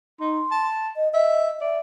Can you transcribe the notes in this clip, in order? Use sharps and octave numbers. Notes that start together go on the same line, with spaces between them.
D#4 C6
A5
D#5
D#5 E5
D5 E5